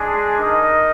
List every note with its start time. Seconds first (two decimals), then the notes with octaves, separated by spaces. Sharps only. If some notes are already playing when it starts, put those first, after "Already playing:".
Already playing: G#3 D4 G#4
0.39 D#4 A#4 D#5